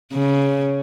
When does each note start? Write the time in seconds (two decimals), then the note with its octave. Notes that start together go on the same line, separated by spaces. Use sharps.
0.13 C#3